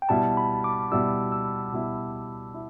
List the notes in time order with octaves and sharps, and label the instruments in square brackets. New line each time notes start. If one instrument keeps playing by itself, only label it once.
[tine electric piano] G5
[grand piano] B2 G3 E4 [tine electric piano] A5
[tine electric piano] B5
D6
[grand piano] B2 G3 E4 [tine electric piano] E6
[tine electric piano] E6
[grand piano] B2 G3 E4
E4